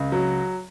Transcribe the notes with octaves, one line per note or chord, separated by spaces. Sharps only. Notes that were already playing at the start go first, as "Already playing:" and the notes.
Already playing: C#2
F#3